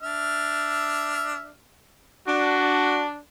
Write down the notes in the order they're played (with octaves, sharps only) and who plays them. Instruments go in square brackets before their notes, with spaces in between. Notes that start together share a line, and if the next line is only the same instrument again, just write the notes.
[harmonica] D4 E5 F6
[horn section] D4 [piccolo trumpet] F#4